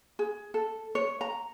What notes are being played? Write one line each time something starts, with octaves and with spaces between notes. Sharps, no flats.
G#4
A4
C#5
A#5